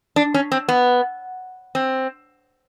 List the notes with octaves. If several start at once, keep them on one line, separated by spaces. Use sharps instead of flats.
D4
C#4
C4
B3
C4